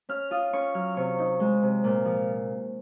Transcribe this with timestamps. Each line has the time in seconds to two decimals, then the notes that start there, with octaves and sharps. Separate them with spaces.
0.09 C#4 F6
0.31 F4 D#6
0.53 C#4 C#6
0.74 F#3 F6
0.97 C3 C#6
1.19 D#4
1.40 G#3
1.62 C3
1.84 A#2
2.05 F3